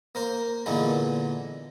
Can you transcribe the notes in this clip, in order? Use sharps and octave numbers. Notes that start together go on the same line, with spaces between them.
A#3 A#4 C5
A#2 D3 E3 G#3 A#3 B3